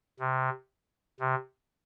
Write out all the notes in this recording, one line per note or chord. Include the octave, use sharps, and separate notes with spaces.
C3
C3